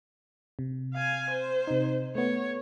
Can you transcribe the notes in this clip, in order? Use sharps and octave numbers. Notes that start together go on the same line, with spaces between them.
C3
F5 G#5
C5
C3 D#4
A3 B3 C#5